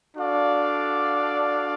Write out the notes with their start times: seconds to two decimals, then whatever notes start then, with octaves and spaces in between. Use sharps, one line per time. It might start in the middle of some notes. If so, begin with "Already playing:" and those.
0.16 D4 F#4 A4 D5 F5